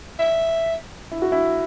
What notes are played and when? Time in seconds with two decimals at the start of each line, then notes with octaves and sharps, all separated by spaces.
0.19 E5
1.12 E4
1.22 F#4
1.32 E4